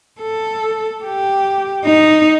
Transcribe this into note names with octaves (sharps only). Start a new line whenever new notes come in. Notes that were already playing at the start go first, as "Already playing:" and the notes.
A4
G4
D#4